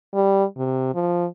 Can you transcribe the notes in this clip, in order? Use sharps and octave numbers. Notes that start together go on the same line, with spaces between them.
G3
C3
F3